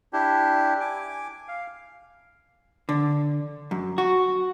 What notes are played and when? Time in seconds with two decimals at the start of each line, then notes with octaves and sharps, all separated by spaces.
0.13 D4 E4 G4
0.80 G#5 D6
1.48 F5
2.89 D3
3.71 F#2
3.98 F#4